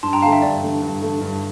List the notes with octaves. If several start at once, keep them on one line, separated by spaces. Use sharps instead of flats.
G2 A5 C6
G5 A#5
D3 A3 F5 A5
E5 G5
G2 D5
D3 A3
G2
D3 A3
G2